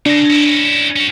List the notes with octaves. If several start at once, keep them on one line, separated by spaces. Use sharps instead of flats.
C#3 D4 A#6
C#4 E4
C#4 F#4